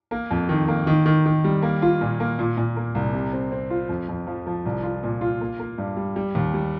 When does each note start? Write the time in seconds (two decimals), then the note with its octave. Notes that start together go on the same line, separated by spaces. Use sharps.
0.11 A#3
0.31 F2
0.49 D#3
0.68 A#3
0.87 D#3
1.06 D#3
1.26 D#3
1.44 G3
1.62 A#3
1.82 F4
2.01 A#2
2.20 A#3
2.39 A#2
2.57 A#2
2.76 A#3
2.95 C2
3.13 C3
3.33 C4
3.52 C4
3.70 F4
3.89 F2
4.08 F2
4.27 F3
4.47 F3
4.66 C2
4.83 F4
5.03 A#2
5.21 F4
5.41 A#3
5.59 A#3
5.78 G2
5.96 G3
6.16 G3
6.35 D#2
6.54 G3